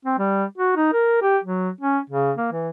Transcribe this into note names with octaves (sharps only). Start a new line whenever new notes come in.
C4
G3
F#4
D#4
A#4
G4
F#3
C#4
C#3
A#3
E3